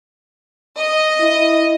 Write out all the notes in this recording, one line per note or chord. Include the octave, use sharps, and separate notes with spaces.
D#5
E4